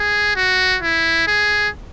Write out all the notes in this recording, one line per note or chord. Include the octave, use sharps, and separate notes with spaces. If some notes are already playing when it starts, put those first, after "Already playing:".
Already playing: G#4
F#4
E4
G#4